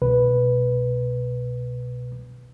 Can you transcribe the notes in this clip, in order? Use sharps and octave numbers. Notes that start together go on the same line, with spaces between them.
C2 B2 B4